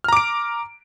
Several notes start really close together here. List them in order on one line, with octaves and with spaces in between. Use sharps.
F6 A#5 D6 D7